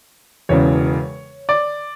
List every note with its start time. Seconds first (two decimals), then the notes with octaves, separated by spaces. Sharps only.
0.49 E1 E2 C#3 C#5
1.49 D5